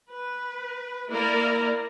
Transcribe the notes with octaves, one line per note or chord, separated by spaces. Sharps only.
B4
A#3 E4 A#4 D5